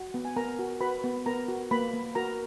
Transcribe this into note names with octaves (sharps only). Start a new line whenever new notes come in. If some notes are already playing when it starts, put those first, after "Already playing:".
Already playing: F#4
B3
G#5
B3 A#4 A#5
F#4
F#4 B4 B5
B3
B3 A#4 A#5
F#4
A#3 B4 B5
A#3
F#4 A#4 A#5